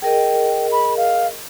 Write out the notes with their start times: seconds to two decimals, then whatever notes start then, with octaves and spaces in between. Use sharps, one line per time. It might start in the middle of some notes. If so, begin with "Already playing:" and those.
0.02 G#4 A#4 D#5 G5
0.72 B5
0.97 F5